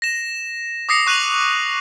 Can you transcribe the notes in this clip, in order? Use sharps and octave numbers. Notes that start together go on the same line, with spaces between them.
A#6 E7
D6 D#6 A#6 C7 C#7
C#6 F#6 D#7 F7 F#7